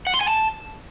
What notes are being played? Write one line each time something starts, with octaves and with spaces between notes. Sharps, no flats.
F#5
C6
G#5
A5